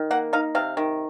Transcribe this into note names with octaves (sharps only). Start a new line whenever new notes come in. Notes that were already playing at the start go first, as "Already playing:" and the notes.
Already playing: D#3
A#3 F#5
D#4 F5
C3 F5
D#3